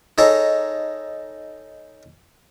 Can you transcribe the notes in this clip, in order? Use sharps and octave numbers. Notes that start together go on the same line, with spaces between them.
D#4 G#4 A4 C#5 A#5